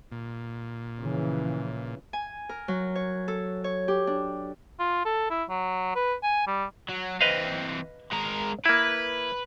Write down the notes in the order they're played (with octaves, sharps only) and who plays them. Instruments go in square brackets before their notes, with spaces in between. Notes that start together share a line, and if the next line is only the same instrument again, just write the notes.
[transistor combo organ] A#2
[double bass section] C#3 E3 F3
[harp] G#5
A#4
F#3
C#5
A4
C#5
G4
D4
[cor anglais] F4
A4
E4
F#3
B4
G#5
G3
[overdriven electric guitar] F#3
[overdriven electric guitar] E3 C4 [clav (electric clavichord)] B4 D#5 F5
[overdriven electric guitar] G#3 A#4
[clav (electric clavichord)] A#3 E4 [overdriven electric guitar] B4